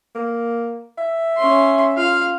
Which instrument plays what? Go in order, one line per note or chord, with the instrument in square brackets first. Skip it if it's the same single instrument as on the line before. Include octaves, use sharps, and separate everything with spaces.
[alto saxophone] A#3
E5
[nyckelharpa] C#4 C6
[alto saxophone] F4 [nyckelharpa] F5